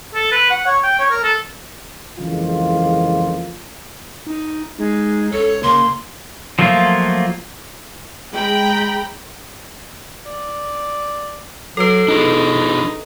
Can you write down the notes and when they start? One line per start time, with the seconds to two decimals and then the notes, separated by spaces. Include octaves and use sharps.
0.15 A4
0.31 B4
0.50 F#5
0.66 C#5
0.83 G5
0.99 C#5
1.10 A#4
1.23 A4
2.19 F2 C#3 E3 G#3 A#3 F4
4.27 D#4
4.79 G#3 D#4
5.33 C#2 A4 C#5
5.63 C#3 A#3 C6
6.59 F3 F#3 A3 A#3 F4
8.32 G#3 G5 A#5 B5
10.25 D5
11.77 F#3 A4 B4
12.08 D4 D#4 F#4 G#4